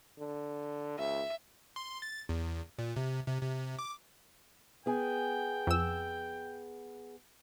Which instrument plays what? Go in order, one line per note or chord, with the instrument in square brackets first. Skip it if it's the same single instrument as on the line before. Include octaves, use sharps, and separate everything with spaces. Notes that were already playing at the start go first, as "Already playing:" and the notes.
[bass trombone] D3
[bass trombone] C#2 [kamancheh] E5
[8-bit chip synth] C6
A6
E2
A#2
C3
C3
C3
D6
[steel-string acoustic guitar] B3 G#4 G#5 [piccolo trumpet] G5
[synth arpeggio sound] F2 E6